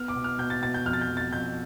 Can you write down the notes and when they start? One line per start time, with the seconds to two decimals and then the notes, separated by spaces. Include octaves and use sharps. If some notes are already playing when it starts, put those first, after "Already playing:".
Already playing: B3 F6
0.08 D6
0.16 B2
0.24 F6
0.39 B2 G6
0.50 A6
0.62 B2 A6
0.74 G6
0.85 F2 F6
0.93 A6
1.01 G6
1.08 F2
1.17 A6
1.32 F2 G6